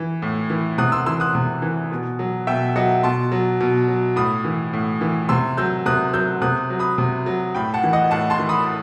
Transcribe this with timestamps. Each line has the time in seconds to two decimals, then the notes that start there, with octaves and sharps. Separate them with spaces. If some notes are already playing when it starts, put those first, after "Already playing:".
Already playing: E3
0.22 A2
0.50 E3
0.78 C3 D#6 F#6
0.92 C6 E6
1.06 E3 C6 E6
1.20 D#6 F#6
1.35 C3
1.62 E3
1.92 B2
2.19 F#3
2.47 B2 E5 G5
2.76 F#3 D#5 F#5
3.03 B2 A5 C6
3.32 F#3
3.60 B2
3.88 F#3
4.16 A2 B5 D#6
4.44 E3
4.73 A2
5.01 E3
5.29 C3 C6 E6
5.57 F#3 E6 G6
5.86 C3 D#6 F#6
6.13 F#3 E6 G6
6.42 C3 D#6 F#6
6.70 F#3
6.79 B5 D#6
6.98 C3
7.26 F#3
7.55 A2 G5 B5
7.74 F#5 A5
7.84 E3
7.93 D#5 F#5
8.11 A2 F#5 A5
8.30 A5 C6
8.39 E3
8.49 B5 D#6